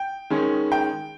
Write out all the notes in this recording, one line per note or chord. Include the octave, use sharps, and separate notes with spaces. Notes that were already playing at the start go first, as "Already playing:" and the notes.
Already playing: G5
D#3 G#3 C#4
G5